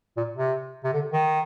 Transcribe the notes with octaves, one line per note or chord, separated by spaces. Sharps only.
A#2
C3
C3
D3
D#3